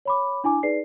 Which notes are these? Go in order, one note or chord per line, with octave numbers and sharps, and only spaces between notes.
C#5 B5 D6
D4 E4 G#5 D6
D#4 G#4 B4 D5 C7